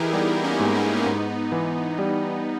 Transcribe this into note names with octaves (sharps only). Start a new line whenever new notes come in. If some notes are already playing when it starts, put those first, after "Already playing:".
Already playing: E3 D#4 E4 G4 G#4 A#4
G3 B3 D#4
A#3 C#4
G#2
B3 D#4
C#4
G#2 B3 D#4
E3
G3